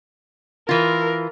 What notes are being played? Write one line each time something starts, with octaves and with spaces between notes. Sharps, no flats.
E3 F4 A#4